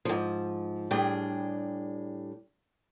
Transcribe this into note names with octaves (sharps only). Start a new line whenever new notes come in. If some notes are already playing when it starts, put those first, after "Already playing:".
G#2 F3
A2 G3 D4 G#4 G5